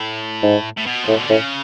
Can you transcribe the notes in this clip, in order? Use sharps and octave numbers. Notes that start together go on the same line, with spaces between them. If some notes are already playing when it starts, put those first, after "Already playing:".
Already playing: A2
G#2
A2
B2
A2 F3
D3
A2 C#3